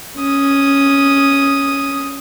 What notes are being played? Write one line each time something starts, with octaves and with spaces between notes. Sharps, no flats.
C#4 D#6